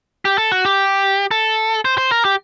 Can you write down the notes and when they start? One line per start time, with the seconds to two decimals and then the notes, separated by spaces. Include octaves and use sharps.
0.25 G4
0.38 A4
0.52 F#4
0.65 G4
1.31 A4
1.85 C5
1.98 C5
2.11 A#4
2.25 G4